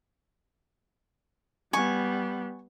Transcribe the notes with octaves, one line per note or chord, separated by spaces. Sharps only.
G3 B3 G#5 C#6